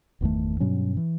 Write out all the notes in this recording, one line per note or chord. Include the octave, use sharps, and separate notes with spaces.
G1 E2 D#3 A3
G2 B2 F#3 C#4
E3